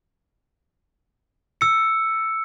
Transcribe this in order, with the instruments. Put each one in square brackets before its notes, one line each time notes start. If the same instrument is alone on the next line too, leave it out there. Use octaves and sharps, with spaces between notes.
[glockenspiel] E6 C#7